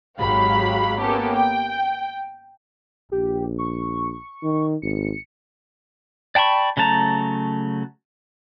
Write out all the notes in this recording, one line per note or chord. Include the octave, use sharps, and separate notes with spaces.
G#1 F#3 G#3 G4 F5 B5
A#3 B3 C#4 G4 A4
G5
A#1 G4
C#6
D#3
G#1 C#7
D5 G5 A5 B5 C#6
C#3 F#3 A3 A5 A#5